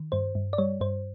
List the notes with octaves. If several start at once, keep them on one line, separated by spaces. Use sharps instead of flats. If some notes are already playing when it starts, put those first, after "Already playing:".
Already playing: D#3
G2 C5
G2
D5
G3 C#5
G2 C5